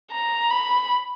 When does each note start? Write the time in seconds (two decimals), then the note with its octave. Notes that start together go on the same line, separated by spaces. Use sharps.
0.12 A#5
0.50 B5